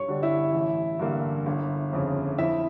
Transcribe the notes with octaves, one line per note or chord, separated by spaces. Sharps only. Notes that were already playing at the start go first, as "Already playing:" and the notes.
Already playing: G2 C#5 C#6
D3 G3 D4
E4 E5
A1
G2 D3 G3 A#3
G1
F2 C#3
F2 E4 E5